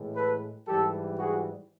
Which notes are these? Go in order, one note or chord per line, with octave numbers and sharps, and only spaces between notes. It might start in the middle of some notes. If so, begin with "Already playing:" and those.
Already playing: A2 E3 G#3
A4 B4
G#2 E3 G3 G4 A4
F#4 G#4